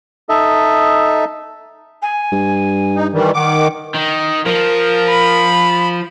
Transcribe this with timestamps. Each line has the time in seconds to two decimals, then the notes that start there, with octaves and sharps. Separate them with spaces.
0.29 D#4 A4 D#5 E5
2.02 G#5
2.32 G2
2.96 D#4
3.13 D#3 E3 G3
3.34 D#3 F#5 D6
3.95 D#3
4.46 F3 A#4
5.10 B5